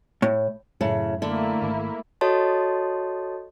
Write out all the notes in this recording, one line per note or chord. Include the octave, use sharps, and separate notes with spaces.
A2
F#2 A2 C#3
D3 A3 A#3 E4
G#1
F#4 A4 C#5 D#5 A5 C6